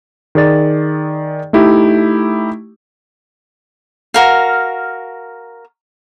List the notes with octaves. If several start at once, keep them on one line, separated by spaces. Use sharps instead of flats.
D#3 G#4 D5 A6
A3 D#4 E4 G4
F#4 A#4 F5